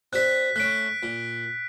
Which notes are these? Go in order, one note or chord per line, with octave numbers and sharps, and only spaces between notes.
C4 D4 G4 F#6 B6
A3 C#4 F#6 B6 D7
A#2